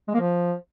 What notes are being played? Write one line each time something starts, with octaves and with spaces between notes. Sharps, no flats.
G#3
A#3
F3